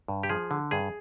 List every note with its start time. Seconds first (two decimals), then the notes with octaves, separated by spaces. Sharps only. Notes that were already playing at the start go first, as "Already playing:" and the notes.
0.08 G2
0.23 G4
0.29 F3 G#4
0.51 D3
0.71 G2 G#4